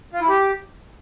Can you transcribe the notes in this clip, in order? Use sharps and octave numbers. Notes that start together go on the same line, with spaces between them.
F4
E4
G4